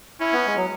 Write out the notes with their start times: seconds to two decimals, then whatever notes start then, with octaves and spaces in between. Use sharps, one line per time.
0.20 C#4 E4
0.33 B3
0.47 G#3
0.56 F#3